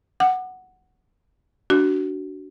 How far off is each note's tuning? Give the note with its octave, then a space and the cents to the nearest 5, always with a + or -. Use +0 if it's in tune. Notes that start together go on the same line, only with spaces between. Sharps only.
F#5 +0 D6 +40
D4 -10 F#4 +15